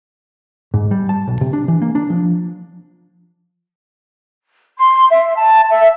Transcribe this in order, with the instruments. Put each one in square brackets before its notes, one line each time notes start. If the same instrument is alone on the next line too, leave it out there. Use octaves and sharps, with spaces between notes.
[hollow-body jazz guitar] G#2
G3
A5
B1
C3
D4
E3
A#3
D4
F3
[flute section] C6
E5
A5
E5